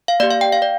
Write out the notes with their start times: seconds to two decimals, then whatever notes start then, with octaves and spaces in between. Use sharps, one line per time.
0.08 F5
0.20 A#3 D5
0.23 G4
0.30 F5
0.41 G5
0.52 F5
0.62 D5